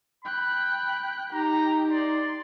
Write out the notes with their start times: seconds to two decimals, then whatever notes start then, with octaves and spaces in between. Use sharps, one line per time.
0.25 G5 B5 F#6
1.32 D#4 G4 G5 A#5
1.91 D5 C6